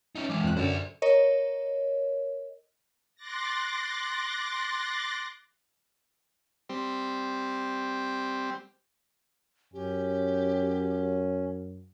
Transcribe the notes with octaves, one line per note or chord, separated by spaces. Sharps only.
C#4 D#4
E3 G#3 D6
F2 F#6
F#2 D3 C5 D5
A#4 C#5 D#5
C6 D6 F#6 A6 A#6
G3 C4
F#2 C#4 G4